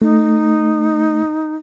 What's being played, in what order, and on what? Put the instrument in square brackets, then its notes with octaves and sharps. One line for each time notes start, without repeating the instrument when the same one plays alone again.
[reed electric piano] A3 [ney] D#4